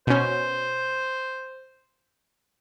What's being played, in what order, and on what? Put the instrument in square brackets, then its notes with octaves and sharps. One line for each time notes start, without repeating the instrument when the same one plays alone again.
[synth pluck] B2 C#4 [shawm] C5